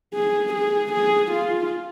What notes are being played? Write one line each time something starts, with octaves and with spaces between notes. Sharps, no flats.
G#4
G#4
G#4
F4